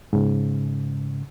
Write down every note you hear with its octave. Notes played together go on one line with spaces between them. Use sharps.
G#2 C#3